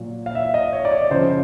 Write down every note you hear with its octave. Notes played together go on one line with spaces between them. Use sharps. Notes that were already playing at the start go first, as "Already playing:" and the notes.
Already playing: A#2 F#3
F5
E5
D#5
C#5
D5
C#5
C#3 F3 C5